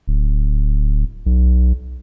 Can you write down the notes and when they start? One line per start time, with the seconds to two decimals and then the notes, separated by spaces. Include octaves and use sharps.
0.08 D1
1.26 B1